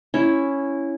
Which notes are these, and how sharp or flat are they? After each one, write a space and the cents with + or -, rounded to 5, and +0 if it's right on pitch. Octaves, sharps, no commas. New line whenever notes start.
C#4 +0 E4 +0